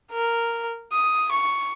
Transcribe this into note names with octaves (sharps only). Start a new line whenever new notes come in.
A#4
D#6
C#6